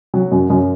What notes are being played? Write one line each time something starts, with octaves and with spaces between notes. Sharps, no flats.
F#3
F#2
F#2